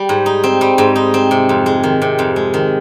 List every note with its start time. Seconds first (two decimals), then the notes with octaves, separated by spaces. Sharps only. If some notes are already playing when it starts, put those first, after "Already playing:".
Already playing: G3
0.09 G#2
0.26 D#4
0.43 C4
0.61 G3
0.78 G#2
0.96 D#4
1.14 C4
1.31 C3
1.49 F2
1.66 G#3
1.83 D#3
2.02 C3
2.19 F2
2.36 G#3
2.54 D#3